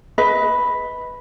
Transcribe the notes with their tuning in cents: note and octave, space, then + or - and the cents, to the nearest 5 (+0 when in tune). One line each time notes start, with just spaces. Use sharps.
B4 +0 D#5 +30